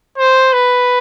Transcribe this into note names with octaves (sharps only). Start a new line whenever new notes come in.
C5
B4